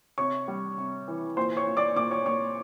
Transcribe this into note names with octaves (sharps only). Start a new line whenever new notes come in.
C3 C#5 C#6
G3
C3
E3
A#2 C5 C6
C#5 C#6
A#2
D5 D6
A#2 D5 D6
C#5 C#6
A#2 C#5 C#6